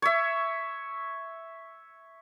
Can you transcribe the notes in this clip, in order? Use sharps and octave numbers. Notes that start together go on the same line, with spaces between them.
C#5 E5